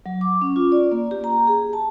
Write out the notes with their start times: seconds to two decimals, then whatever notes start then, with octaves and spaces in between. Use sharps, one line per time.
0.06 F#3
0.21 D6
0.41 C#4
0.56 F4
0.72 D5
0.92 A#3
1.11 G4
1.24 A#5
1.47 G#4
1.73 A5